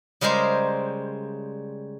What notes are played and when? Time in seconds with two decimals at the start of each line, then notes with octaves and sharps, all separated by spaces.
0.21 C#3 G3 G#3 A#4 C5